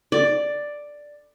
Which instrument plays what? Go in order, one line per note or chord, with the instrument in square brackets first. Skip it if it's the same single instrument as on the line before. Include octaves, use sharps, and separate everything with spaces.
[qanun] D5